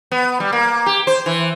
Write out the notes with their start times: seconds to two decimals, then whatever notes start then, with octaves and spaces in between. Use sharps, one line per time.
0.12 B3
0.40 G3
0.53 A#3
0.86 G4
1.07 C5
1.26 E3